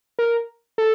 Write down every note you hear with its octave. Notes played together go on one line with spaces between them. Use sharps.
A#4
A4